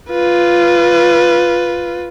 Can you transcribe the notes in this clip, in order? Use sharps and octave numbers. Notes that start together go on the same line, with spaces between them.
F4 B4